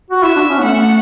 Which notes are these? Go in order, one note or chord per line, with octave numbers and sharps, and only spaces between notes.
F#4
E4 E5
D4
C#4
B3
A3 F#5